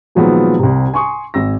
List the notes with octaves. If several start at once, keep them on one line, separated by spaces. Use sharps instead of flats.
A#2 D#3 F3 F#3 G#3 B3
C2 C3
G#5 C6 C#6 D#6
G#1 E6 A#6